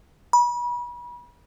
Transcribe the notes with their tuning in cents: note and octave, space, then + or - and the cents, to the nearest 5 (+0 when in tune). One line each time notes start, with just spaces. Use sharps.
B5 -35